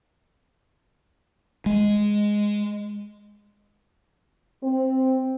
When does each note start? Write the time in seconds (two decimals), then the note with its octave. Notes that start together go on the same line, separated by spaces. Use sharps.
1.66 G#3
4.63 C4